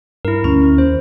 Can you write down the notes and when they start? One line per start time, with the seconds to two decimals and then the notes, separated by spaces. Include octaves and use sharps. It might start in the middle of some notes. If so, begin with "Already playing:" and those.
0.25 G2 E4 A#4
0.44 D2 C#4
0.78 D#2 C5